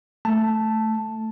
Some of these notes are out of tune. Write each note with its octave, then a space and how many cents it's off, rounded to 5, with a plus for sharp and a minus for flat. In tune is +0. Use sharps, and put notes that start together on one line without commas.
A3 +0 A5 +0